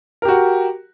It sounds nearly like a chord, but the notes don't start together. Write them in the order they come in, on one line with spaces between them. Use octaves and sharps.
A#4 G4 F#4